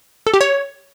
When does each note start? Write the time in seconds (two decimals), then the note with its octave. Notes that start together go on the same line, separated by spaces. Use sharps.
0.27 A4
0.34 G4
0.41 C#5